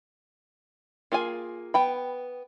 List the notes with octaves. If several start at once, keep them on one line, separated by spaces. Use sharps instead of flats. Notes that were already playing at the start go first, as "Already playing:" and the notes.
A#3 F4 G#4 G#5
B3 G5 B5